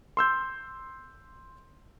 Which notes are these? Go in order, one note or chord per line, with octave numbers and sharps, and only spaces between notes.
C6 E6 G6